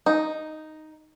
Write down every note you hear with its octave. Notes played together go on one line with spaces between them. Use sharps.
D#4